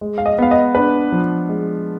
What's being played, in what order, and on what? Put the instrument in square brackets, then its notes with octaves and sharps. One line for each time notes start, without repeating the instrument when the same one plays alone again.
[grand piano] G#3
[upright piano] F5
D#5
[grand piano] B3 [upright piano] F5
[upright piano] D#5
[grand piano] D4 [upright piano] B4
[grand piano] F3
G#3